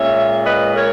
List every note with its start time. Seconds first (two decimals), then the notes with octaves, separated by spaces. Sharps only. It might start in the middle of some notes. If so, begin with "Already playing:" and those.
Already playing: A#2 G#3 C#4 C#5 E5
0.46 B4 D#5
0.76 A#4 C#5